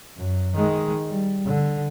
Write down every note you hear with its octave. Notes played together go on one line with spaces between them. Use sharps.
F#2
D#3 G#3
G3
D3